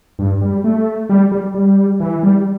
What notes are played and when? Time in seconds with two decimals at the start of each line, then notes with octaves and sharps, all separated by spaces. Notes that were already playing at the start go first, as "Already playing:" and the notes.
0.19 G2
0.41 G3
0.64 A3
1.09 G3
1.32 G3
1.55 G3
2.00 E3
2.23 G3